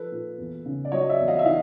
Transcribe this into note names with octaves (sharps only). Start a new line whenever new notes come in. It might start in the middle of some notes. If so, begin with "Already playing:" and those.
Already playing: F3 A4 B4
A#2
E2
C#3
D5
F#3 C#5 D#5
D5 E5
E2
D#5 F5
E5
E3 D#5 F5